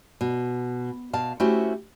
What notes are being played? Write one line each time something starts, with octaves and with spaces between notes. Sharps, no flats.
B2
B2 F5 A5
A3 C#4 E4 F#4 G4 C5